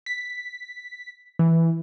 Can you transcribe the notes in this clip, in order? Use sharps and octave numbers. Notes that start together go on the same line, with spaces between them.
B6
E3